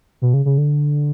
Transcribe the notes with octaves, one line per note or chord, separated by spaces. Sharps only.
B2
C#3
C#3
D3